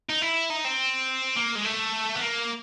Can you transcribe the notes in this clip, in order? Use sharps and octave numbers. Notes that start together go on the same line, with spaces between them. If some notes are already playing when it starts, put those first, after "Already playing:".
D#4
E4
D#4
C4
A#3
G#3
A3
B3
A#3